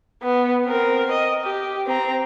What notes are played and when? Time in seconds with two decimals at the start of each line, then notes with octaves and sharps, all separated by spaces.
0.23 B3
0.66 C4 A#4
1.11 D#5
1.44 G4
1.86 C4 A#5